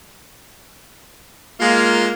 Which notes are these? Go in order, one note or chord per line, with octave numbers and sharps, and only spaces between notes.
G#3 A#3 F4